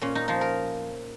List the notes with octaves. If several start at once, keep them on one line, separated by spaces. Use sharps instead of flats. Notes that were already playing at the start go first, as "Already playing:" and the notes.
A#2 C#4
D#4
F3 D#4
A#4